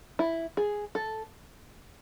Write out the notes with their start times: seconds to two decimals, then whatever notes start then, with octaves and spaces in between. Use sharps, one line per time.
0.19 E4
0.57 G#4
0.95 A4